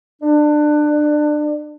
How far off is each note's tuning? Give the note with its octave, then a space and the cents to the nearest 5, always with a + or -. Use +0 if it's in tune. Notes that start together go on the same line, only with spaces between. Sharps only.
D4 +25